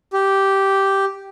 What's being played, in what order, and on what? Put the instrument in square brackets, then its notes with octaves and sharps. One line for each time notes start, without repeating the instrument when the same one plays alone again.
[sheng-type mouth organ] G4